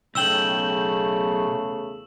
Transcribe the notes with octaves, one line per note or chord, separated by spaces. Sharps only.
B1 E2 C#3 A3 G5 E6 E7 F#7